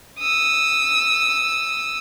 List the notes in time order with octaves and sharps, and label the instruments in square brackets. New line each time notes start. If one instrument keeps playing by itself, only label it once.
[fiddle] D#6 E6